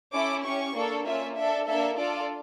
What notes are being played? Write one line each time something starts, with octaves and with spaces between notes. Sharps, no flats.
C#4 E4 A4 D6
C#4 G4 C#6
A#3 D4 A4
A#3 C#4 F4 E5
D4 A4 E5
A#3 D4 A4 E5
D4 F4 A4 D5